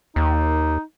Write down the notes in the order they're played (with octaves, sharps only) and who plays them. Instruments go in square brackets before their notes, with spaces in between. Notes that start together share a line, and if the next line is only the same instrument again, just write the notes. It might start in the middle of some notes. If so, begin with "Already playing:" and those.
[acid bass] D#2 [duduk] D#4